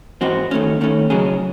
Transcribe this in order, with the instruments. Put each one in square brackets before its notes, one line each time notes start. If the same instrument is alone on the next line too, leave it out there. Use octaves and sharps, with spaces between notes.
[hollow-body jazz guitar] G#2 E3 C4 F#4 C5
D#3 A3 C#4
D#3 A3 C#4
C#2 C#3 F#3 C#4 G#4